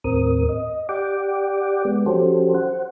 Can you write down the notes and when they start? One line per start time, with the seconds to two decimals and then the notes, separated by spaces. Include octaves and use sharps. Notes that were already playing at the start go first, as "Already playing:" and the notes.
0.04 D#2 A2 C4 A#4 D#6
0.49 D#5
0.89 G4 D5 F#5 G5 D6
1.85 G#3 B3
2.06 F3 C#4 F#4 G4 A4 C5
2.54 C5 F#5